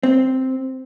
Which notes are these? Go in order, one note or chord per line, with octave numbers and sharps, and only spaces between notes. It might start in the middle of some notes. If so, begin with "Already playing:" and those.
C4